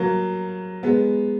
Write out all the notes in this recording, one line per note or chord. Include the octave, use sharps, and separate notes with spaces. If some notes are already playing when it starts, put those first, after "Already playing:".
Already playing: F#3 A#3
G#3 B3